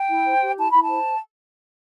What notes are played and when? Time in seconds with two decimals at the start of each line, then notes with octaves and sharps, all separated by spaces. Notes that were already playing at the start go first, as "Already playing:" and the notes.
Already playing: G5
0.09 E4
0.25 C5
0.41 G4
0.57 E4 A5
0.70 E4 B5
0.82 A5
0.89 C5